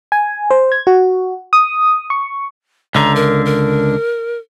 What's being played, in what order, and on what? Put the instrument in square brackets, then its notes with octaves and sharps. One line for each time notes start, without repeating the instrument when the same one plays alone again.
[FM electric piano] G#5
C5
G#6
F#4
D#6
C#6
[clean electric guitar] C#2 D3 [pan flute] A#5
[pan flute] A#4
A#4